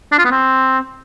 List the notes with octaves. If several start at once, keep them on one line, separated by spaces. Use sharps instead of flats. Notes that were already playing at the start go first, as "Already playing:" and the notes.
D4
F4
B3
C4